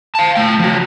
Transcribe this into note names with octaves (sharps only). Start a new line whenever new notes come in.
F5 A5
A3 G5
F3 F#4